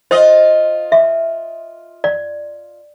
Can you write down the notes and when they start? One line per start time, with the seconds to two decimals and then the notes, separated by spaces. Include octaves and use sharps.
0.11 F4 C5 D#5
0.92 E5
2.04 D5